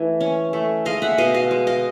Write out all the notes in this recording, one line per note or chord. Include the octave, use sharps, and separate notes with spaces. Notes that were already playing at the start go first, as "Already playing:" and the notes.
Already playing: E3 A3
C#4
A3
G#3 D#5 F5
E5 F#5
B2 D#5 F5
D#5 F5
G#3
D#5 F5